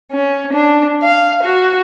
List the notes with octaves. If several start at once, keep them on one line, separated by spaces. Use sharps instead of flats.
C#4
D4
F5
F#4